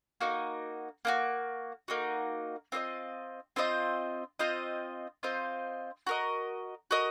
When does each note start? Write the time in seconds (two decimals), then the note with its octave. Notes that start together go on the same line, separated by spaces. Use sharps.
0.21 A#3 D#4 F#4
1.05 A#3 D#4 F#4
1.88 A#3 D#4 F#4
2.72 C4 F4 C5 D#5
3.56 C4 F4 C5 D#5
4.39 C4 F4 C5 D#5
5.23 C4 F4 C5 D#5
6.07 F#4 A#4 D#5
6.91 F#4 A#4 D#5